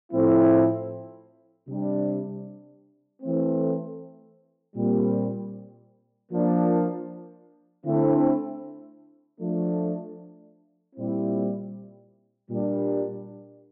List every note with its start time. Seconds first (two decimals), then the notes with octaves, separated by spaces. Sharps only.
0.12 A2 F3 C4 E4
1.68 C3 G3 D4
3.21 E3 A3 C4
4.76 A#2 G3 C4
6.30 F3 A#3 D4
7.85 D3 A3 C4 E4
9.40 F3 A3 D4
10.95 A#2 G3 C4 E4
12.49 A#2 G3 D4